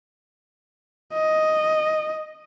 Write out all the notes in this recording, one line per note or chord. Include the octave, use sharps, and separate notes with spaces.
D#5